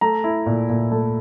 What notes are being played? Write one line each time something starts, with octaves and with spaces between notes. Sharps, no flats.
A3 A#5
E4
A#2
A#2
A3